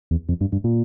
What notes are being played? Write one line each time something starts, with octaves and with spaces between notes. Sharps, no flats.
E2
F2
G2
G2
A#2